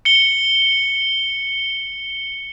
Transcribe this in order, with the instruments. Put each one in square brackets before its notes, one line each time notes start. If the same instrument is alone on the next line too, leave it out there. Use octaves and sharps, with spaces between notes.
[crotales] C#7 G7